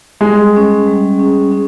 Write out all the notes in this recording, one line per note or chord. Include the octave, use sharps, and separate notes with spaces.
G3 G#3
C#4 G#4
G3
C#4 G#4
C#4